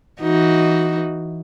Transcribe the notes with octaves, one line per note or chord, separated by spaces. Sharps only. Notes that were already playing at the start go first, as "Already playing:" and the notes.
E3 D#4 F#4